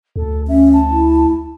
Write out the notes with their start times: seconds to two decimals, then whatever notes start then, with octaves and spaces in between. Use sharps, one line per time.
0.16 D2 A4
0.48 C#4 E5
0.72 A5
0.91 E4